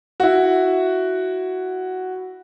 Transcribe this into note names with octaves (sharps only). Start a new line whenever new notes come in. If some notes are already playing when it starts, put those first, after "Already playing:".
E4 F#4